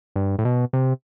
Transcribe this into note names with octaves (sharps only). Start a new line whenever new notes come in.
G2
A2
B2
C3